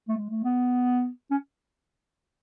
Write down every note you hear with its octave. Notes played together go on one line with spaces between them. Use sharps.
A3
G#3
A3
B3
C#4